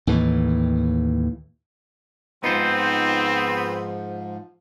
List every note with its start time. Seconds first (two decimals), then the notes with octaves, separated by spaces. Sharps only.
0.07 D#2 A2 E3
2.44 G#2 F3 B3 C4 D#4 F4 C5